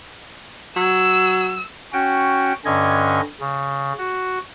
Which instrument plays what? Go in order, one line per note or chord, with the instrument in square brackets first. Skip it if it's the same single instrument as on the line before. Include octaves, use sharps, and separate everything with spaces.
[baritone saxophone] F#3 [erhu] E6
[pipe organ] C#4 F#4 G5
G2 D3 C#4 D#5 G#6
C#3
F#4